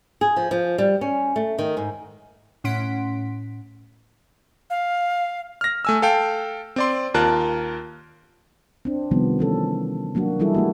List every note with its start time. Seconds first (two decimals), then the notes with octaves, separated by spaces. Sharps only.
0.21 G#4
0.36 F3
0.51 F3
0.78 G3
1.01 C#4
1.36 A3
1.59 D#3
1.77 G#2
2.64 A2 C#4 F#5 C6 B6 D7
4.70 F5
5.61 F6 A#6
5.85 A3 G#5 E6
6.02 A4 F5 G5
6.76 C4 D5 C6
7.14 D#2 F4 A#4 A5 F#6
8.85 C4 D4
9.11 C3 D#3 F3 G3 B3
9.39 E3 C#4 A4
10.15 F#3 A#3 D4 F#4
10.40 E3 G3 D#4 E4 G#4 A4
10.55 A3 A#3 F#4